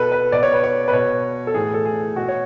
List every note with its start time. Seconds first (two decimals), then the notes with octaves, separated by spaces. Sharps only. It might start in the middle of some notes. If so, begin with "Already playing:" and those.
Already playing: B2 A4 B4
0.12 B4
0.32 B2 D5
0.43 C#5
0.53 B4
0.64 C#5
0.88 B4
0.93 B2 C#5
1.47 A4
1.54 A2 E3 G#4
1.74 A4
1.85 G#4
2.16 B2 F#4
2.28 C#5